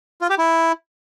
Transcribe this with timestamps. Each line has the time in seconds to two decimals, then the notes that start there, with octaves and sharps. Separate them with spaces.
0.21 F4
0.30 G4
0.38 E4